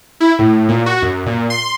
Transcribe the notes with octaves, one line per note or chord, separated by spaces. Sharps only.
E4
A2
A#2
F#4
F#2
A#2
C6